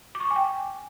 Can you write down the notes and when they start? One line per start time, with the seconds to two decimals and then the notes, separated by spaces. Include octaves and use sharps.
0.15 D6
0.20 C#6
0.25 D6
0.31 G#5
0.36 G5